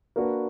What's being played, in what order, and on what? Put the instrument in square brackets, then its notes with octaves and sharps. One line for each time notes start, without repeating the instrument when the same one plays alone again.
[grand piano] A#3 D4 F#4 B4